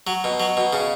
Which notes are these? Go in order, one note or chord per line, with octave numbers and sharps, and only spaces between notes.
F#3
B2
F#3
B2
C#3